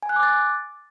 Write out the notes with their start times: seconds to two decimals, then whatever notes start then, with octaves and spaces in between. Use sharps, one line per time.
0.03 G#5
0.09 F#6
0.16 D6
0.23 A6